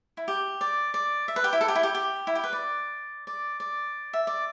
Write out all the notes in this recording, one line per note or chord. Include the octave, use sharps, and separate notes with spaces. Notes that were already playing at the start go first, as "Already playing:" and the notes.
E4
G4
D5
D5
E5
B4
G4
E4
A4
G4
E4
G4
G4
E4
G4
B4
D5
D5
D5
E5
D5